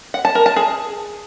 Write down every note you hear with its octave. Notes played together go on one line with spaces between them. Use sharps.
F#5
A5
A#4
A5
G#4